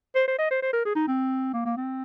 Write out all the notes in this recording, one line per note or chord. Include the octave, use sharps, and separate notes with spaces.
C5
C5
D#5
C5
C5
A#4
G#4
D#4
C4
A#3
A#3
C4